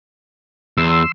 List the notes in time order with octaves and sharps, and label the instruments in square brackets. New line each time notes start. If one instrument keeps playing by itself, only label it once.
[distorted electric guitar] E2 [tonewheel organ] C6 E6